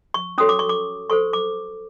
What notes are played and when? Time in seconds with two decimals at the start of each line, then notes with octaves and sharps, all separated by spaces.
0.14 C#6
0.38 C#4 F#4 A4 C#5 D#6
0.49 D6
0.59 C#6
0.69 D6
1.10 F#4 A4 C5 C#6
1.33 D6